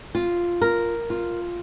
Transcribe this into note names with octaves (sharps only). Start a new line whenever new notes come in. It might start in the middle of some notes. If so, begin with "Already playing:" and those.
F4
A#4
F4